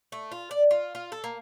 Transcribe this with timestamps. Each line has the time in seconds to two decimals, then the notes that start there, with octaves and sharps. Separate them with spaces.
0.12 A3
0.32 F4
0.51 D5
0.71 F4
0.95 F4
1.12 A4
1.24 A#3